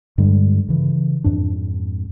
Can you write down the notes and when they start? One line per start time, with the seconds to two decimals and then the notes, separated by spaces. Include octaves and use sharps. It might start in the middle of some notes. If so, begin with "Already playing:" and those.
0.18 G2 D3 G3 G#3
0.69 C#3 E3
1.24 F2 G#2 D4